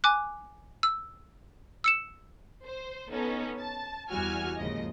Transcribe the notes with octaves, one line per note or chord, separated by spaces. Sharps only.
G#5 D6 F#6
E6
E6 C#7 E7
C5
B3 C#4 D#4 A4
A5
E2 G3 E4 F#4 G#5 F6
D#2 G#2 C#3 F3 D#5